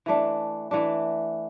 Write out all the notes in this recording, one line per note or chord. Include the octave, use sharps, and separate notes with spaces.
E3 A3 D4
E3 A3 D4